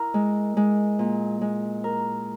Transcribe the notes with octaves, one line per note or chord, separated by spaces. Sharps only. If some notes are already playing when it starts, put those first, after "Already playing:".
Already playing: E4 A#4
G#3
G#3
A#2
G#3
A#4